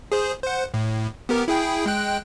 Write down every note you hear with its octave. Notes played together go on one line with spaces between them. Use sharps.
G#4 C5
C5 F#5
A2
B3 G4 A#4
E4 G#4 G5
G#3 G5 F#6